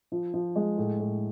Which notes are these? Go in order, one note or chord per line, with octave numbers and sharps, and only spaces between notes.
F3
F3
G#3
A2
A2